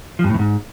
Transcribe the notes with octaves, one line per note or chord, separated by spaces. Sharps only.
F3
G2
A2
E2
G#2